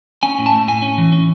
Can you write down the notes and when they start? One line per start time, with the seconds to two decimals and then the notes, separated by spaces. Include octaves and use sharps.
0.23 C#4 G#5
0.39 A2
0.46 A5
0.53 A3
0.68 A2 G#5
0.82 C#4
0.98 E3
1.12 C#4